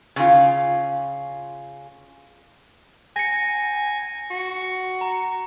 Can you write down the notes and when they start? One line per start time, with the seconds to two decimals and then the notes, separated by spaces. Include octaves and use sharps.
0.16 C#3 F4
3.16 G#5 A#6 C#7
4.30 F#4
5.01 A#5